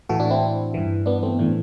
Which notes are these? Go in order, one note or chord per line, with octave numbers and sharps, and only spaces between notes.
A2 E3 F#4 A4
D4 F#4
C4 E4
G2 E3
B3 D4
A3 C4
A2 E3 A3